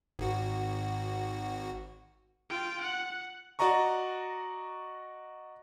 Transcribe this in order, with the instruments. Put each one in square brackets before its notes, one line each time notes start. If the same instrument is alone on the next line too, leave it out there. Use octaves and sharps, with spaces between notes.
[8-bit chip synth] G#1 F#4
[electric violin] F4 G5
F#5
[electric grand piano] F#4 D5 D#5 A#5 C#6